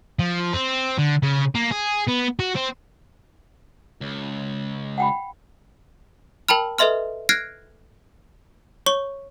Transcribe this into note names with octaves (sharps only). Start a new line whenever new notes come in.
F3
C4
D3
C#3
A#3
G#4
B3
F#4
C4
C#2
F#5 G5 B5
A#4 G5 A5 B5 F6
A4 B4 D#5 E5 C6 F6
F6 F#6 G#6 A#6 C7 D7
C#5 C#6 G7